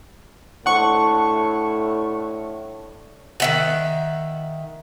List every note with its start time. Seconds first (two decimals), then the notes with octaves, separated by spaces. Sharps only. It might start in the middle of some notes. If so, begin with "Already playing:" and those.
0.66 A2 D4 C5 F#5 C#6
3.40 D#3 E5 F#5